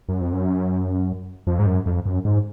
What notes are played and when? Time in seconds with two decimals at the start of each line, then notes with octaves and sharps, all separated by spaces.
0.09 F#2
0.21 F2
0.33 F#2
1.47 F2
1.59 G#2
1.66 F#2
1.86 F2
2.06 F#2
2.25 G#2